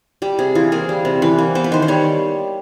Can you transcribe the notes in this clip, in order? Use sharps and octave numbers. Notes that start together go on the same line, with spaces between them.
G3 G4
C3 G#4
E3 F4
A#3 G#4
G3
C3
E3 B4
A#3
B3 C5
B4
D#3 C5
C5
G3 C#5